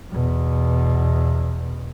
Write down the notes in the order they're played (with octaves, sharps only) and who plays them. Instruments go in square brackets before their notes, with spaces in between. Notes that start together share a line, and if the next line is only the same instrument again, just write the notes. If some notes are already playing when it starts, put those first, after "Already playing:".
[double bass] E2 B2